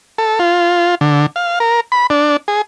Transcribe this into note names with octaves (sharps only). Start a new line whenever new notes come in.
A4
F4
D3
F5
A#4
B5
D4
G#4